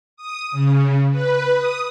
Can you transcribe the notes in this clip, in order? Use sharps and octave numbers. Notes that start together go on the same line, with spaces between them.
D#6
C#3
B4
D#6